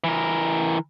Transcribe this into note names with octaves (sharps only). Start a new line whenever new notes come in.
E3 A#4